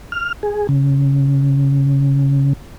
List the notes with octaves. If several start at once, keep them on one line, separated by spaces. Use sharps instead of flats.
F6
G#4
C#3